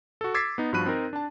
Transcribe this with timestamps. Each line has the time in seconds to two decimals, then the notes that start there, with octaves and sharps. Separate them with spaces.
0.21 F#4 A4
0.34 D6 E6 G#6 A6 B6 C7
0.58 B3 D#4
0.73 G2 F3 F#4 B5 F#6 D#7
0.86 C4 D#4 A#4
1.13 D4 A5